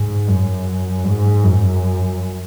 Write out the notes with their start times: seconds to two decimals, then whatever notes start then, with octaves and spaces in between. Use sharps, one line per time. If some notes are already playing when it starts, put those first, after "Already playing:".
Already playing: G#2
0.28 F#2
1.05 G#2
1.44 F#2